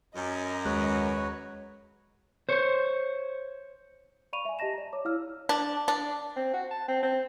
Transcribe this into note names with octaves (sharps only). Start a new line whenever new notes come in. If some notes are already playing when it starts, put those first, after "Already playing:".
F#2 D#5 A#5
D#2 G#3 F#4 B4 C#5 F#6
C5 C#5
D5 F5 B5 C#6 D#7 F7
E5 G#5
G4 D#5 A5 A#6 E7
D5 A#5
C#5 D6
E4 C#5 F5 E6 F6
D4
D4
C4
F#4
A5
C4
C4